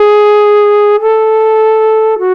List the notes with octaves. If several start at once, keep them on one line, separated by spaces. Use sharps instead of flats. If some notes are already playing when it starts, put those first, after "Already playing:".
Already playing: G#4
A4
F#4